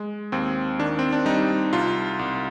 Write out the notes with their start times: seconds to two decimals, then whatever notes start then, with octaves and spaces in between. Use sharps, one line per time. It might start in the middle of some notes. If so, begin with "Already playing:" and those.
Already playing: G#3
0.32 D#2 C4
0.79 D#3 D4
0.99 C4
1.12 D4
1.26 G3 D#4
1.73 C2 F4
2.19 C2